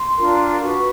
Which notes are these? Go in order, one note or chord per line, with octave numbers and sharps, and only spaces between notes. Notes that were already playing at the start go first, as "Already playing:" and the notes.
Already playing: C6
D4 F4 A#4
F#4 B4 C#6